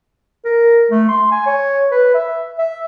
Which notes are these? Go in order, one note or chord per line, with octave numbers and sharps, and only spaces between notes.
A#4
A3
C6
G#5
C#5
B4
E5
E5